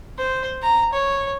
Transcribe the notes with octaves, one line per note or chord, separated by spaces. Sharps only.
C5
A#5
C#5